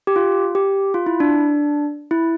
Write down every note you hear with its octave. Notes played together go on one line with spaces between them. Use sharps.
G4
F4
G4
F4
E4
D4
E4